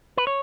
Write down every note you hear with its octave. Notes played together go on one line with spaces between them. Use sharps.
B4
C#5